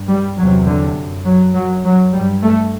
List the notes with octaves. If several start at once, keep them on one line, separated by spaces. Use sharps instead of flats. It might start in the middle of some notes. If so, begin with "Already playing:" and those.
Already playing: G2
G3
E2 C3 F#3
D3
F#2
F#3
F#2 F#3
F#3
G2 G3
A3